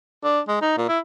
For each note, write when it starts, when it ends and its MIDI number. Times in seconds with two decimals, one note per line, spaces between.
0.24 0.41 62
0.48 0.57 56
0.62 0.77 63
0.78 0.85 46
0.89 0.99 64